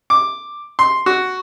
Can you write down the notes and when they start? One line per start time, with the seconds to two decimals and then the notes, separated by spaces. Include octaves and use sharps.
0.10 D6
0.79 C6
1.06 F#4